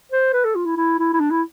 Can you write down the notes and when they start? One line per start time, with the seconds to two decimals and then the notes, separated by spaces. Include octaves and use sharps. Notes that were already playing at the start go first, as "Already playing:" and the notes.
0.12 C5
0.33 B4
0.44 A4
0.55 F4
0.66 E4
0.77 E4
0.99 E4
1.13 E4
1.20 D4
1.31 E4